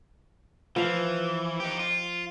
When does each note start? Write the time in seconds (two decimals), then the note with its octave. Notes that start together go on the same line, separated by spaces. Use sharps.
0.76 E3 F3 F5
1.60 D#4 G4
1.79 F4